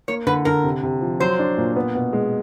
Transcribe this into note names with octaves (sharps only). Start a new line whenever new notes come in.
A#3 C#5
D3 B4
D3 A#4
C3
C3
F3
F#3 C5
D4
A#2
B3
B2
G#3